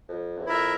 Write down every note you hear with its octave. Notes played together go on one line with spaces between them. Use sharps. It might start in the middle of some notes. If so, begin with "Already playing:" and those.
F2
E2
F2 E4 A#4 E5